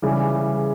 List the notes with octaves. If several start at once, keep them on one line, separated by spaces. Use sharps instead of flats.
C#3 E3 G3